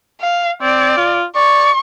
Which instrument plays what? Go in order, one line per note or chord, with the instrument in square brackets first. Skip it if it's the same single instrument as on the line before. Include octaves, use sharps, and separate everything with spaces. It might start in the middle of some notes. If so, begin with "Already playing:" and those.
[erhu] F5
[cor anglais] C4 [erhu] D5
[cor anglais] F4
[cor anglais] D5 [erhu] C#6